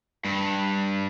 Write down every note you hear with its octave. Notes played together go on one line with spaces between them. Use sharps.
G2